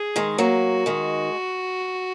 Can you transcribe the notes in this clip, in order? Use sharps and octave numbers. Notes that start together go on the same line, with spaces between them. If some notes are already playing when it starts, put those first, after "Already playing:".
Already playing: G#4
D#3 G#3
F#3 A#3 F#4
D#3 G#3